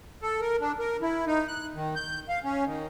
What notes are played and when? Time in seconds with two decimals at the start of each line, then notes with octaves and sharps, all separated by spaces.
0.22 A4
0.41 A#4
0.61 D4
0.79 A#4
1.02 E4
1.27 D#4
1.48 F#6
1.74 D#3
1.95 G6
2.29 F5
2.44 C#4
2.65 D#3